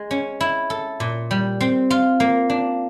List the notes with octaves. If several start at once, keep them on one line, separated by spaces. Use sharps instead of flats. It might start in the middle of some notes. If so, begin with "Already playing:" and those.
Already playing: G#3
C#4
E4
A4
A#2
G3
C4
F4
A#3
D4